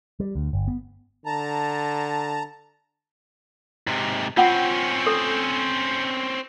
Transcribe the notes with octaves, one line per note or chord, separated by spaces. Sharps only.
G3
D2
G1
B3
D3 A5 A#5
G#2 C3
C4 C#4 F4 F#5 G5
A4